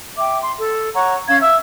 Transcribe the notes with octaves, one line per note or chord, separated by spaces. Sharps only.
E5 G5 D6
C6
A4
C#5 F#5 A#5 C#6
C#4 F5 G#6
E5 E6